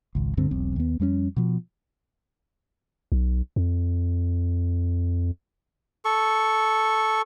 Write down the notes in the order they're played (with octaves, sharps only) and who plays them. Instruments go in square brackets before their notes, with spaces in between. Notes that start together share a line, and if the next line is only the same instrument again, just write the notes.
[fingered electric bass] G#1 C#2
C#2 G2 D3 C4
E1 B1 C4
D#2 B3
F2 G3 A#3 C#4
B2 F3
[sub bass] B1
F2
[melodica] A4 C#6